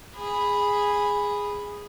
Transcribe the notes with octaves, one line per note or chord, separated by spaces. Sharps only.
G#4 B5